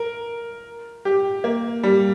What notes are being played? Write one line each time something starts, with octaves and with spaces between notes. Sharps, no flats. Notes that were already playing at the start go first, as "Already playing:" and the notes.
Already playing: A#4
G4
A#3
G3